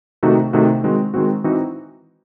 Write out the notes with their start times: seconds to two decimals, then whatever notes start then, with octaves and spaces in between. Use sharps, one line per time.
0.23 C3 D#3 A3 D#4 F#4
0.53 C3 D#3 A3 D#4 F#4
0.84 D#3 G#3 C4 F#4
1.14 D#3 G#3 C4 F#4
1.44 E3 C4 D#4 F#4